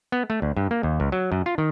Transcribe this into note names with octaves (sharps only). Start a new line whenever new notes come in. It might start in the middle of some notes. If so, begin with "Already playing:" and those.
B3
A3
D2
G2
A#3
D#2
C#2
F#3
F#2
F4
D#3